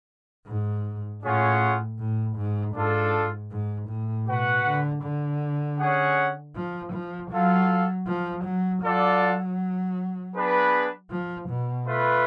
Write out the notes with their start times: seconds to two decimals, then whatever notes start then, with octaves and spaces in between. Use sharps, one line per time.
0.47 G#2
1.23 A2 C#4 F4 G#4 C#5 F#5
1.99 A2
2.37 G#2
2.74 G#2 D4 F4 A4
3.51 G#2
3.88 A2
4.27 B2 F#4 B4 F#5
4.64 D3
5.03 D3
5.79 C#4 G#4 C#5 F#5
6.55 F3
6.93 F3
7.31 F#3 F4 A4 F5
8.07 F3
8.45 F#3
8.83 F#3 F4 A4 D5 F#5
10.35 B3 D4 G#4 B4
11.11 F3
11.49 B2
11.87 A3 F4 B4